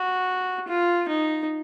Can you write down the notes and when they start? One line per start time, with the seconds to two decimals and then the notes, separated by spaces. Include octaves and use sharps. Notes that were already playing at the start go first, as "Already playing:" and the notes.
Already playing: F#4
0.68 F4
1.08 D#4